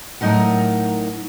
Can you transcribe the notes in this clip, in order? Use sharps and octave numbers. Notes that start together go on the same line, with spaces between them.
A2 F#3 D#4 A#4 F#5